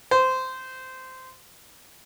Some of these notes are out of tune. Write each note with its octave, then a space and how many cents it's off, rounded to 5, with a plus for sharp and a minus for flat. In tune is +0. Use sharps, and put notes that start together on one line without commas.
C5 -15